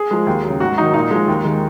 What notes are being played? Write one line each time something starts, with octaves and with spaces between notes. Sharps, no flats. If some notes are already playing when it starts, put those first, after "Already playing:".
Already playing: G#4
F3 G#3
D#2
F#3
C#3
G#2 F#4
D#3 F#3 D#4
A#2 D#4
F3 G#3
D#2
D#3 G#3